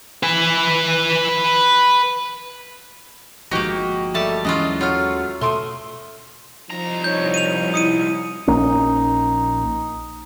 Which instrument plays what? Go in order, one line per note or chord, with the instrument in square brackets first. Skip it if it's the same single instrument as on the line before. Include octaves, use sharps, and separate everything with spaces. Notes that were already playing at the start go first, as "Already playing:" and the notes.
[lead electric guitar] B4 G#5
[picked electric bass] G1 F3 G#3 [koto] A#3 D#4 [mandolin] F#4 G4 G5
[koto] G3 A5 [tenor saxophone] A3
[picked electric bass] D#2 G#3 C#4 [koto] E3 F#3 F4 [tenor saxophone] D#5
[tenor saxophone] F#3 [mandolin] A3 F6 [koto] F4
[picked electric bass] B2 [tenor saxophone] A3 [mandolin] C6 D6 D#6
[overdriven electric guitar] C2 A#5 [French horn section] F3 D#4
[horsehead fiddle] C#5 [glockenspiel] G6
[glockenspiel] D#7 F7
[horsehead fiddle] E4 [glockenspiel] D#6 C#7 D#7
[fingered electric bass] A#1 A#3 C#4 [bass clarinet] D#4